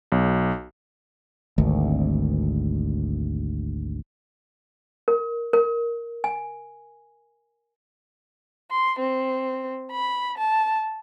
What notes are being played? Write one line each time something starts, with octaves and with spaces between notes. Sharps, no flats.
B1
G#1 D2
A#4
A#4
G#5
C6
C4
B5
A5